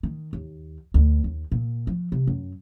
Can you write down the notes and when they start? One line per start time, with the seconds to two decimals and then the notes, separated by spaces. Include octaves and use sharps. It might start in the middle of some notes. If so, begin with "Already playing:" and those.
0.03 D#3
0.33 D#2
0.94 D2
1.24 D#2
1.52 A#2
1.87 F3
2.12 C3
2.27 F#2